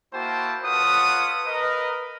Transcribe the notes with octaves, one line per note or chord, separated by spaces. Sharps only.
A#3 E4 F#4 C5 G5 A5
F4 A4 B4 C#5 F#5 D#6
A#4 B4 D#5